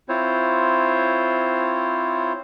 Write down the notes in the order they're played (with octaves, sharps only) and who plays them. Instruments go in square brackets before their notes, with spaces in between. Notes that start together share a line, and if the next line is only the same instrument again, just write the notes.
[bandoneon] C4 E4 F4 C5 C#5